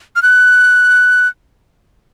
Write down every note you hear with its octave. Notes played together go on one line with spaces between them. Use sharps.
F6
F#6